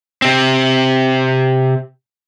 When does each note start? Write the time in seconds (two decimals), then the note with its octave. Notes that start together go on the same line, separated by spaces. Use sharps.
0.22 C3 C4